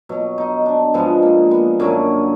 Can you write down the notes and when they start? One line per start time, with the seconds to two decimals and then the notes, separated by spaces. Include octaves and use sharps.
0.09 B2 F#3
0.38 D#4
0.66 D4
0.94 G#2 F3 G#3 B3
1.22 A#3
1.51 B3
1.80 F#2 D3 F#3 A#3